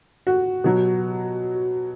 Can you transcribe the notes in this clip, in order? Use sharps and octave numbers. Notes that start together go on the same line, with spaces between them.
F#4
B2 F#3